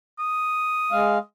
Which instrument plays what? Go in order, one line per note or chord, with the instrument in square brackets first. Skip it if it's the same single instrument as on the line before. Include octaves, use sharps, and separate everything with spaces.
[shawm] D#6
[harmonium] G#3 F5